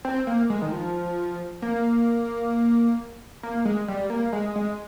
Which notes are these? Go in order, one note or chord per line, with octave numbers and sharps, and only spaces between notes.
C4
A#3
G#3
D#3
F3
A#3
A#3
G#3
G3
A#3
G#3
G#3